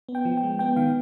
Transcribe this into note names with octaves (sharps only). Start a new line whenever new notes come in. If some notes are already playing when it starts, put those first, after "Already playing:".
B3
G5
F3
G5
G#3
B3 G5
D#3 F5